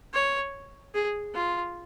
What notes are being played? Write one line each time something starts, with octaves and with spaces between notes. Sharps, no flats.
C#5
G#4
F4